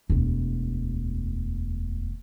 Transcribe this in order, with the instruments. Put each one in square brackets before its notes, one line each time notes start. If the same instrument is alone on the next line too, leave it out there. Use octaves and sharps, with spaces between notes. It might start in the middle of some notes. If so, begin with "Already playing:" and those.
[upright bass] E1 D2